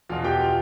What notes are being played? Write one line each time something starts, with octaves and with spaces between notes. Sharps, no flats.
E2 B2 F4 F5
G4 G5
F4 F5